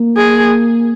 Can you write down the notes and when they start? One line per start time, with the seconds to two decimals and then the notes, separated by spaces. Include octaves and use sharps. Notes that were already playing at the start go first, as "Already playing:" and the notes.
Already playing: A#3
0.17 G#4